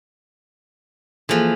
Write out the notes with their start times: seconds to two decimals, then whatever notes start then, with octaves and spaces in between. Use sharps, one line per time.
1.29 E3 F3 A#3 G#4 A4